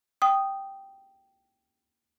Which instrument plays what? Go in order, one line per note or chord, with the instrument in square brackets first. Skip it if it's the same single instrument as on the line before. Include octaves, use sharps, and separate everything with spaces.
[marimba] G5 D#6